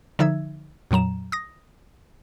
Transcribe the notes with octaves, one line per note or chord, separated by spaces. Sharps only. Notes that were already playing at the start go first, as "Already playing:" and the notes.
D3 F3 D#4 E5 E6 G#6
F2 A#2 F#3 A#5 E7
D#6 A#6